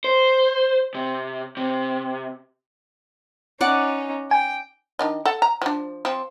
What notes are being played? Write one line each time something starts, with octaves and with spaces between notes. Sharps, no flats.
C5
C3
C3
C#4 D#4 D5 F#5
G5 G#5
D#3 D4 D#5
A4 F#5
A#5
F3 D4
F3 C4